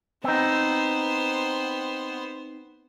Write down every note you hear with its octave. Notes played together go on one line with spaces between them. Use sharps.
B3 C4 D#4 C5